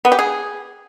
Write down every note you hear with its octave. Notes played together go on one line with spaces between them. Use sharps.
B3
G4
G#4